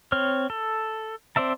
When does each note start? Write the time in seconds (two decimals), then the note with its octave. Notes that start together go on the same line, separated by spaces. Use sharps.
0.12 C4 C#5 F6
0.50 A4
1.36 C4 C5 D5 E5 A5